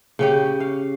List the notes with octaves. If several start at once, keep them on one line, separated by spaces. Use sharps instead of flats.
C#3 C#4 G4
F5